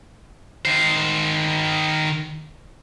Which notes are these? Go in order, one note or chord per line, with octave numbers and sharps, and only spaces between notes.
D#3 C5